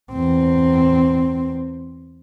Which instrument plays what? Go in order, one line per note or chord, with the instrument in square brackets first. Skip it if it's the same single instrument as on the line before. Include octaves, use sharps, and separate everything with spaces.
[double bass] E2 C4